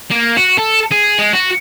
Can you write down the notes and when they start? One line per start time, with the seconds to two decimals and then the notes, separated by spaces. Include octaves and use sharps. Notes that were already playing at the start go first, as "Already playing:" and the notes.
0.11 A#3
0.37 F#4
0.58 A4
0.91 G#4
1.19 G#3
1.33 F#4